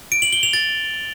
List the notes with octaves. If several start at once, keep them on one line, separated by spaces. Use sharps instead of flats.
D7
F#7
G7
F7
A6